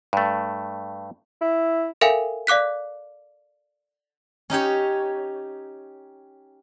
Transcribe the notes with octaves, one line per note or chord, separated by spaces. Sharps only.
G2 A3
E4
A4 A#4 E5 F5 G5 G#5
D5 F5 D6 F#6 B6
C#4 D#4 G4 C#5